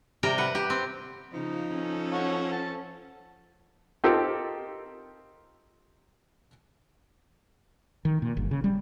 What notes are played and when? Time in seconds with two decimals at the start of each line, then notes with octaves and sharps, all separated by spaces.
0.23 C3 G3 A#4 G5
0.38 B4 F#5
0.55 G4
0.70 C4
1.33 C#3 F3 D#4
1.74 C#4 A4
2.13 C#5 F#5
2.52 A5
4.04 C4 D#4 F4 G4 A4 A#4
8.05 D#3
8.22 A#2
8.37 G1
8.51 C#3
8.64 G3